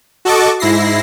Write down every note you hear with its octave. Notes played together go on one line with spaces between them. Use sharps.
F#4 A4 D#5 A5 C#6 D6
G#2 E4 A#6 C7